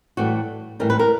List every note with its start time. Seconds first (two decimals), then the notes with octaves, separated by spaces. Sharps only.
0.17 A2 E3 G3 F#4
0.79 A2 E3 G3 A#4
0.90 B4
0.99 A#4